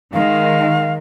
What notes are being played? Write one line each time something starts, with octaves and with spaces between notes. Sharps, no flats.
D#3 G#3 F5